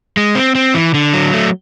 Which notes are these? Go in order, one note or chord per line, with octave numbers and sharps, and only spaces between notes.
G#3
C4
C4
E3
D3
F#3
A3